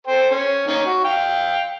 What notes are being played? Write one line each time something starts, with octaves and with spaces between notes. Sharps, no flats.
A4 C5 G5
C#4
D#3 A#3 C#4
F#4
F5 G5